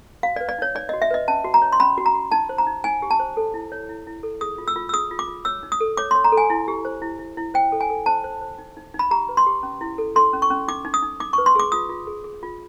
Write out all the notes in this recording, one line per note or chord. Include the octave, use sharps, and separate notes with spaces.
F#4 F5
D5
B4
D5
D#4 C#5
D#4 D5
F#4 D#5
E5
B4 D#5
C#4 A5
F#4
A#5
C#5
C6
C#4 B5
F#4
A#5
F#4
D#4 A5
C5
A#5
D#4
D#4 G#5
G4
A5
C5
A4
E4
C#5
E4
E4
A4
G#4 D#6
F4
E6
F4
E6
G#4 D#6
F4
D6
F4
C#5 E6
D#4
D#6
A4
C#5 D6
C#5 C6
A#5
A4
G#5
E4
G4
C5
E4
E4
E4
C5 G5
A4
G#5
A4
C5 A5
C5
C5
D#4
D#4
D#4
B5
G4 A#5
B4
C6
G4
C#4
E4
A4
A4 C6
C#4
C#6
C#4
D#4 D6
D#4
D#6
D#4
D#4 D6
B4 C#6
C6
G#4 D6
F4 D#6
F4
G#4
G#4
F4